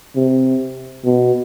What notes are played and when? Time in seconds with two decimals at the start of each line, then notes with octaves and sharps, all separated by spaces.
0.16 C3
1.05 B2